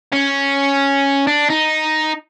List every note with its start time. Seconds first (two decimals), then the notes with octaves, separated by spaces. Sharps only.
0.13 C#4
1.27 D4
1.49 D#4